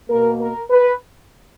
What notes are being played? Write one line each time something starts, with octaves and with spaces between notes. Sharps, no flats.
B2 A#3 A#4
A#4
B4